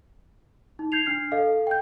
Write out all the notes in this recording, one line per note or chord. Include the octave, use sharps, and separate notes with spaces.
D#4
G6 G#6 C7 F7
D4 F6 C7
A4 D#5 F5
G5 G6